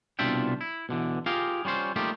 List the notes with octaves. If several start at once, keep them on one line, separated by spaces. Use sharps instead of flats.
C2 B2 D4 F4 E5 G5
E4
B2 D3 E3
F4 G4 G#4 A#4 F5
G3 C#4 F4 C5
G3 A3 A#3 D#4 F4 G4